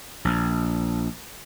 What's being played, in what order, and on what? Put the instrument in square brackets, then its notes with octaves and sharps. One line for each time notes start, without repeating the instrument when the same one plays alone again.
[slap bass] A#1